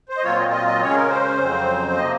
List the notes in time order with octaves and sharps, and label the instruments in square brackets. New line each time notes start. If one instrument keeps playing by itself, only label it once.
[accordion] C5
D#5
A#2 F#3 C4 F4 C#5
D#5
D#5
D#5
C#3 G#3 C#4 C#5
G#4
A#4
C5
F2 C#3 F#3 C4
C3 F3 A#3 D#5